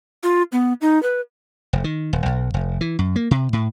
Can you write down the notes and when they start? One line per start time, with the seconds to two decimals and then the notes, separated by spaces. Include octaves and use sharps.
0.23 F4
0.52 B3
0.81 D#4
1.03 B4
1.73 F1
1.84 D#3
2.13 D#1
2.26 B1
2.54 F1
2.81 E3
2.99 F#2
3.16 A#3
3.31 C3
3.53 A2